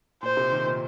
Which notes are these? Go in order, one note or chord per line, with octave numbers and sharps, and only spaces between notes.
A#2 C5
C3
D#3
A#2